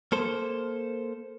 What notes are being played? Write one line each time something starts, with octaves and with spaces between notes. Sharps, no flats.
A#3 A4 C5